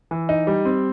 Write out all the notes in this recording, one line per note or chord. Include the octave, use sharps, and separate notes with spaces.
E3
D#4
G3
C4